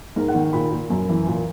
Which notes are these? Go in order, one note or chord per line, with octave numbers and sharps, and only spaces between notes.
G#2 A#4
F#5
D#3
A#2 B5
A#2
F#2
E3
A#2